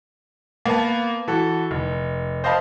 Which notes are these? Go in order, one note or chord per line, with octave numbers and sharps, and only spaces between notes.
A#3 B3 B4 A5
E3 F#4 A4
F1
C5 D#5 F5 A5 B5